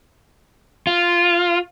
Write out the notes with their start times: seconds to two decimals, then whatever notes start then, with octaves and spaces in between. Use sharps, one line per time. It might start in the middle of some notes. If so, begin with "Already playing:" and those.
0.87 F4